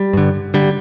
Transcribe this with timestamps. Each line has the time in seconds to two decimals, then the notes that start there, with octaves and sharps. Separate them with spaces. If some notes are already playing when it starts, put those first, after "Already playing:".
Already playing: G3
0.13 G2 D3
0.54 D3 G3